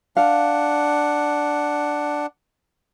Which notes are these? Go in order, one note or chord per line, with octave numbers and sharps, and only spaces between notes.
D4 F5 F#5